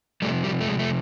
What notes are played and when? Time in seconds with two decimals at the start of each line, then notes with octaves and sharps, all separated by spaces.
0.22 F3 G3 A3
0.27 C3
0.44 G3
0.61 A3
0.67 G#3
0.79 A3